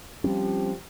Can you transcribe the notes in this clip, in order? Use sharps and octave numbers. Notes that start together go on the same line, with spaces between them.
F3 G3 C4 C#4 G4